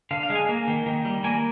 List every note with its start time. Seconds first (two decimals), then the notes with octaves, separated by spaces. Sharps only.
0.11 D3 F5
0.23 F5
0.30 G#3
0.35 G#5
0.49 A#3
0.68 D#3
0.86 D#3
1.05 G3
1.24 A#3 G#5